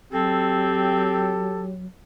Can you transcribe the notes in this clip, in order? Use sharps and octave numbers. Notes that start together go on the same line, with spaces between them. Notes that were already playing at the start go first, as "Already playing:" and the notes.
F#3 C4 G4 A4